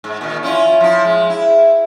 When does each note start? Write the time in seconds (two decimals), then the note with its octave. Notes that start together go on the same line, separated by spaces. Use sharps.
0.04 G#2
0.21 A#2 D#3
0.43 C#4 E4 F4
0.80 F3 E4
1.05 G#3
1.30 E4